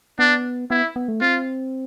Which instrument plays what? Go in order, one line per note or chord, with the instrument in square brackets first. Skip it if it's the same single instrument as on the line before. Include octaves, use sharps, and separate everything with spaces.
[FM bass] B3 [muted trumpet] D4
[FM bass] B3 [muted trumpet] E4
[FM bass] B3
A3
[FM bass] C4 [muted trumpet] F4